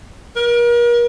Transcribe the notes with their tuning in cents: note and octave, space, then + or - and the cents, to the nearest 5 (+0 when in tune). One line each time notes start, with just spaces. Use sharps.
A#4 +40